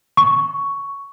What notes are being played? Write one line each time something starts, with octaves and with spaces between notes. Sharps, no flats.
C#6